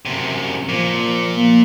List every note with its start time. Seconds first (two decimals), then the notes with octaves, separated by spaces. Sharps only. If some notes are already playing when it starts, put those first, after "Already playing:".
0.06 F#2 C3
0.69 A#2 F3
1.37 A#3